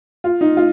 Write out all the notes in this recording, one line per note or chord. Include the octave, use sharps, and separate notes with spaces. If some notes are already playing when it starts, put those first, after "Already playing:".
F4
D#4
F4